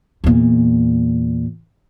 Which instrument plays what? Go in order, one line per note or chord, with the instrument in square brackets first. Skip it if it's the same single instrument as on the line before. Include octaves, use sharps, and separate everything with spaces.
[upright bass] E2 A#2